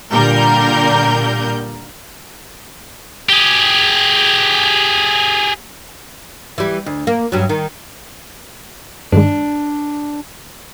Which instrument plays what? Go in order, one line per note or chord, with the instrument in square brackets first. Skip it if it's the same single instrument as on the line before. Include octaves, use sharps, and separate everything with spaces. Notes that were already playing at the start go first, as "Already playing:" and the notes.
[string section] A#2 D3 G3 A#4 G6
[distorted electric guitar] G4 G#4
[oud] E3 G3
D2
A#3
G2 F#3
D#3
[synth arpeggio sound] G2 D#3 G#3 [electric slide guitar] D4